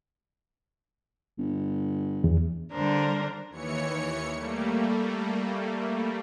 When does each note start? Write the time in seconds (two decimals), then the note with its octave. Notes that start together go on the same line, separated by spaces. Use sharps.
1.38 G1
2.24 E2
2.73 D3 G3 D4 A#4 C5
3.50 D#2 E3 C#5 C#7
4.34 G3 A3 A#3